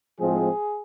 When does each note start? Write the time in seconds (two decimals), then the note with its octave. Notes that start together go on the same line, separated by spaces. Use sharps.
0.20 A2 F3 G#3 C4 G#4